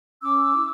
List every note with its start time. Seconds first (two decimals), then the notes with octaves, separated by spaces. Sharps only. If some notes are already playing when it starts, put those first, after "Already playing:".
0.22 C#4 D6 E6
0.57 E4